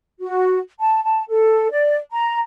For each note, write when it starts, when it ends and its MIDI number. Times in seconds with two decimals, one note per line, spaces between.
0.19 0.59 66
0.79 1.03 81
1.04 1.23 81
1.28 1.71 69
1.71 1.97 74
2.11 2.39 82